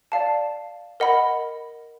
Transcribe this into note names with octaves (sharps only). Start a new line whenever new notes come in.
D5 F5 A5
A#4 D#5 F#5 B5